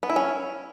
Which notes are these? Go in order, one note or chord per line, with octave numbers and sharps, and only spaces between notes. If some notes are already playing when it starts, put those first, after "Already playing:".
B3
E4
C#4